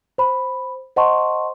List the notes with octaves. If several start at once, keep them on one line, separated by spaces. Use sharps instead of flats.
C5 B5
C5 D#5 F#5 A5 C6 C#6